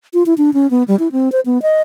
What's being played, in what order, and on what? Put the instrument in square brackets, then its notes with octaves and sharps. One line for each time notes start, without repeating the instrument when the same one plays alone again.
[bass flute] F4
E4
D4
C#4
B3
G3
E4
C4
C5
B3
D#5